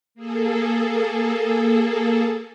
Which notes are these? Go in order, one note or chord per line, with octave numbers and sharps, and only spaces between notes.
A#3 G#4 A4